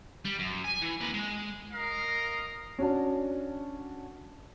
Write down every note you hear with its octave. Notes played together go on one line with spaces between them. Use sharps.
G3
F#2
G#5
E3
A#3 B4
G#3
A#4 D#5 F5 A#5
C#4 D4 F#4 A5